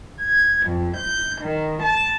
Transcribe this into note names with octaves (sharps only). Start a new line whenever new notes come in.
G#6
F2
G6
D#3
A5